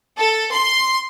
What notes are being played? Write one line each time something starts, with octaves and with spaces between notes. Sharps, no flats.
A4
C6